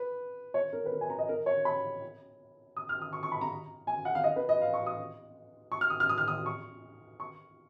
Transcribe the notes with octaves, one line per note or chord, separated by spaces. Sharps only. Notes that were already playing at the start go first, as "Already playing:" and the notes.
Already playing: B4
C#5
A#4
B4
A#4
G#5
A#5
D#5
A#4
C#5
B5
D#6
F6
D#6
C#6
C#6
B5
A#5
G#5
F#5
F5
D#5
B4
D#5
F5
C#6
D#6
C#6
F6
D#6
F6
D#6
F6
D#6
C#6
C#6